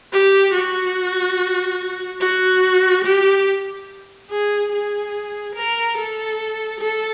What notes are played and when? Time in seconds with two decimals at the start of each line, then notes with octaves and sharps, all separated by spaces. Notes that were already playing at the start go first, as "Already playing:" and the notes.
0.12 G4
0.54 F#4
2.21 F#4
3.05 G4
4.30 G#4
4.72 G#4
5.55 A#4
5.97 A4
6.80 A4